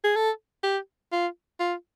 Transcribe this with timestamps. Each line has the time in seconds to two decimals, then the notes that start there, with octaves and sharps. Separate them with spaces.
0.04 G#4
0.16 A4
0.63 G4
1.12 F4
1.60 F4